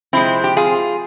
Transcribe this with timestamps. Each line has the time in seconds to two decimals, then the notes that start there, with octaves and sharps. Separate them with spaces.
0.13 C3 F3 G#3 C4 E4
0.44 G4
0.57 F4 G#4